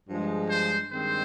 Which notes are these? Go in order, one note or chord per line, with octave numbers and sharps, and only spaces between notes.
G2 F3 G#3
C5
G2 D#3 G#3 C4 C5